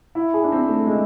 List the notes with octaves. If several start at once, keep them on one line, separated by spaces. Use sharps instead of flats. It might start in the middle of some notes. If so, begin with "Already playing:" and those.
E4
G#4
D4
C4
A3
G#3